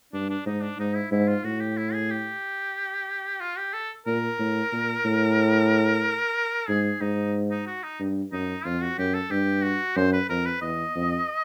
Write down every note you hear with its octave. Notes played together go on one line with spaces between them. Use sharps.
G2 D4
D4
G#2 D#4
D4
G#2 D#4
E4
G#2 E4
F4
A2 F#4
G4
E4
G#4
G4
F4
G4
A4
A#2 A#4
A2
A#2
A2
G#2 G#4
G#2 D#4
D#4
F#4
D#4
G2
F#2 D#4
F2 F4
F#4
F#2 G4
A4
G2 G4
F#4
F#2 C5
B4
F2 A#4
B4
E2 D#5
F2